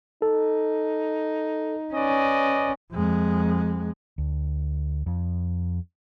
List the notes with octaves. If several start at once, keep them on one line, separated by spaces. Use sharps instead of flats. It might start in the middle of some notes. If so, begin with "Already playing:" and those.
D#4 A4
C#4 B4 D5 D#5
F2 G#3
D2
F2